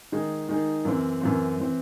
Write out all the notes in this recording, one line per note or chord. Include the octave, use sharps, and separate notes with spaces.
D#3 G#3 D#4 G#4
D#3 G#3 D#4 G#4
F#2 E3 C4
F#2 E3 C4
E3 C4